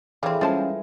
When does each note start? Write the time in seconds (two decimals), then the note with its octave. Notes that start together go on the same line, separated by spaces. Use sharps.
0.23 E3 G3 C4 G#4 A4 C#5 F5
0.41 G3 G#3 C#4 F4 C5 F5 G5 A5